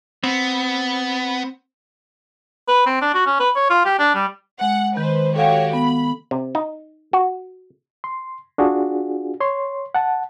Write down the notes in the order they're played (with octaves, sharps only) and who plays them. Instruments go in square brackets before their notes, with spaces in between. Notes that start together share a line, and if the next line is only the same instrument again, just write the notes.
[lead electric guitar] B3 [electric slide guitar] C4
[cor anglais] B4
C4
D4
F#4
C#4
B4
C#5
F4
G4
D4
G3
[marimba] G#3 [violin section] F#5
[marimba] D#3 [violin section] B4 C5
[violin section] F#4 G4 C#5 [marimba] A4 F5 G5
[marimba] B3 [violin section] B5
[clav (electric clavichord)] C3
D#4
F#4
[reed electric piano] C6
D4 F4 F#4 G#4
C#5 C6
F#5 A5